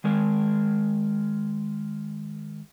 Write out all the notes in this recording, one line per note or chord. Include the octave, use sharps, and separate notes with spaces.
D#3 G#3 A#4